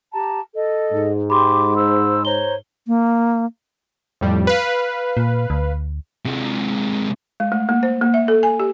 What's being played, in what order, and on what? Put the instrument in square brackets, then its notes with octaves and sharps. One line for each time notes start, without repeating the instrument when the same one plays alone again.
[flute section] G4 A5 A#5
A4 D#5
[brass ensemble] G#2
[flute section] G4 D6 [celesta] B5 C6
[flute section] C5 E6
[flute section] C5 C#5 A#5 [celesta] G7
[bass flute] A#3
[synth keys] F2 A2 G3
B4 F5
[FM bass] A#2
D2
[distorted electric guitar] C3 G#3
[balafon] G#3
A3
A#3
C5
A#3
E5
A4
G#5
G4